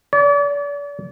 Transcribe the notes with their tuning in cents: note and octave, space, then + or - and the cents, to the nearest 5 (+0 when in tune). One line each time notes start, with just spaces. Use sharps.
D5 -40